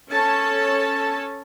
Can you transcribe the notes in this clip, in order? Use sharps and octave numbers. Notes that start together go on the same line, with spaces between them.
C#4 A4 C#5 A5